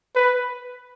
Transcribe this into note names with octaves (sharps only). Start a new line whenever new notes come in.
B4